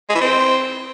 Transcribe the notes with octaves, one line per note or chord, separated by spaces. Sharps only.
G#3
E3
C4